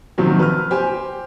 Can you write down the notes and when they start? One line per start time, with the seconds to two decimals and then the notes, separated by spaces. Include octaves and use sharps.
0.18 C3 D#3 F3 F#3 C#4
0.39 B4 F6
0.71 G4 C5 G#5